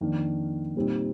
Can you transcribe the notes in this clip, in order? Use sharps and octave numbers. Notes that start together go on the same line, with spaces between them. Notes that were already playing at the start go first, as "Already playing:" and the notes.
F2 D#3 A#3 D4
A#2 G3 C4 D#4